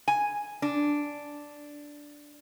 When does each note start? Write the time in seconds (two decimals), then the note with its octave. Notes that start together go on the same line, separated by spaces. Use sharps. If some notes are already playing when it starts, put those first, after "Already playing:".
0.08 G#5
0.62 D4